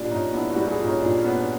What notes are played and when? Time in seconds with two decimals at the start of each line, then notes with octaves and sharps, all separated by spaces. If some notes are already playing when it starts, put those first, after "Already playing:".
Already playing: A#2 G3 D4
0.10 A#2 C#4 D#4
0.33 B3 D4 E4
0.51 E4 F#4
0.56 G3
0.67 F#4 G#4
0.78 A#2
0.84 C#4 D#4
1.01 A#2 D4
1.18 C#4
1.24 B3
1.36 D4